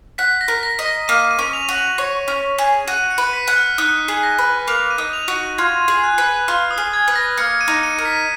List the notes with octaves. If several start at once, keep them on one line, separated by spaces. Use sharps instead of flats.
F#5 B6
A#6
A#4
A#6
D#5
A#6
A#3 D#7
D#7
C#4
F7
F#4
F7
C#5
C#4
G#4
F#4 D#7
C#7
B4
B6
F#5
F6
D#4 F#6
G#4
A#6
B4
A#3 F7
D#7
D#4
F7
F#4
D#7
F4 G#6
G#4
F#6
B4
F4 F6
D#6
G#4
G#6
B4
A#6
A#3 C#7
D#7
D#4
D#7
A#4
B6